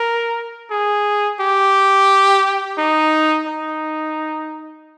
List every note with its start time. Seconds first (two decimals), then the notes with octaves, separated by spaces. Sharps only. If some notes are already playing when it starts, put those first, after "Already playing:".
Already playing: A#4
0.71 G#4
1.40 G4
2.78 D#4
3.47 D#4